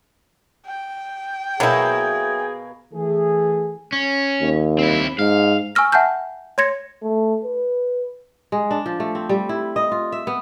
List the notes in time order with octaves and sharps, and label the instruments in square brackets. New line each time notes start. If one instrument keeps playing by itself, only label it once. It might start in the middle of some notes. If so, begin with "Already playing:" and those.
[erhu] G5
[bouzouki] B2 A#3 [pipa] F#3 E4 [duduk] G#4
[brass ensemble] E3 A3 G#4
[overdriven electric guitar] C#4
[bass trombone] D#2
[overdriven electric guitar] C4 E4
[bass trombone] G#2 [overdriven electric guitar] F5
[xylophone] G#5 C#6 E6 F6 A#6
E5 F#5 G#5 A5 F6 G6
C#5 C6 G#6 A#6 C#7
[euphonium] A3
B4
[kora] G#3
D4
F3
A3
C4
G3
E4
D#5
F4
E5
B3